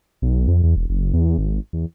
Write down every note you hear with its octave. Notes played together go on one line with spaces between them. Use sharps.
B1
F2
E2
E1
F#1
E2
G#1
E2